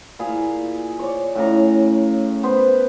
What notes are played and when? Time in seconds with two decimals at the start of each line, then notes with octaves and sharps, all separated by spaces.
0.19 A#2 E4 G#4 F5
0.99 C#5 D5
1.35 A2 C#3 A#5
2.43 B3 B4 C5